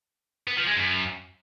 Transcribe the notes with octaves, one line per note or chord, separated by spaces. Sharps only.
B3
F3
G#3
F#2